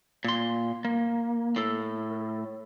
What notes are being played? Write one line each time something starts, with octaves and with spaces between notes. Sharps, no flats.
A#2 C6
A#3
A2 A4